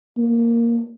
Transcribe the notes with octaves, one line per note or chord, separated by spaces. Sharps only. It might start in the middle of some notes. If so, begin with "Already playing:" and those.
A#3